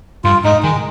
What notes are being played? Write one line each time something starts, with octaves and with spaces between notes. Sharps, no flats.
G2 F4
G#2 D#4
D#3 G#3